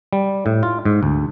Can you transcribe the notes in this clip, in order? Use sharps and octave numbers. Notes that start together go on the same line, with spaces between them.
G3
A2
F4
G#2
D2